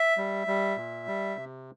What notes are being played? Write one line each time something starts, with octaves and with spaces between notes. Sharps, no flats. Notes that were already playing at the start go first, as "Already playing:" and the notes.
Already playing: E5
G3
G3
A#2
G3
C3